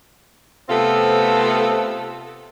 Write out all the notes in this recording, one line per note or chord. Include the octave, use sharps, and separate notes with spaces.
C3 A3 B3 C4 F4 A4